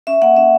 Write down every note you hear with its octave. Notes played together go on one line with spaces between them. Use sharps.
C#4 E5
A#3 F#5
C#4 E5